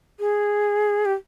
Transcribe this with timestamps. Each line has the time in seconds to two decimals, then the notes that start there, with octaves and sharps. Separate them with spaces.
0.20 G#4
1.05 G4